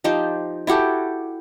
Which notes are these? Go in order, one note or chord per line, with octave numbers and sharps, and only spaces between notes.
F3 D#4 G4 C5
E4 F#4 G4 A4